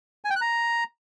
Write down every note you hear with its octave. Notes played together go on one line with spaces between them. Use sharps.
G#5
G5
F#6
A#5